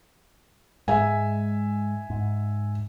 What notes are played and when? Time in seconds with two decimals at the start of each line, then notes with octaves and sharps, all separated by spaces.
0.88 G#2 G#3 E5 G#5
2.10 G#2